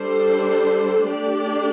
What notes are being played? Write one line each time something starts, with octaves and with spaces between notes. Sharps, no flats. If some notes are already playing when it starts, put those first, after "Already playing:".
Already playing: G3 D4 A4 C5
A3 D4 G4 D5